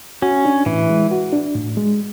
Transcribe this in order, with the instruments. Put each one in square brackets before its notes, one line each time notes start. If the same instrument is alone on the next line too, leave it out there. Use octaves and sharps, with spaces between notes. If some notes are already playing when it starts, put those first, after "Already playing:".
[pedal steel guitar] C#4 [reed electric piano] F#4
[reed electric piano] D4
[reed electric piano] A2 [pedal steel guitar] E3
[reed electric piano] G#3
F#4
D4
A2
G#3